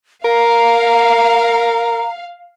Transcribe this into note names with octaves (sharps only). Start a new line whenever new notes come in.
A#4 F5 A#5